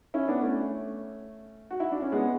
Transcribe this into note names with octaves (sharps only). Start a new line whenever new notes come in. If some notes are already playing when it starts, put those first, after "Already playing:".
C#4 E4
B3 D4
A3 C#4
F#4
E4
D4
C#4
G#3 B3